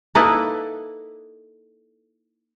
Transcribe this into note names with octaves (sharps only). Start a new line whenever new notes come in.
A#3 D#4 E4 A4 B4